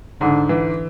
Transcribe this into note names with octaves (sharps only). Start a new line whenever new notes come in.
G#2 D3
E3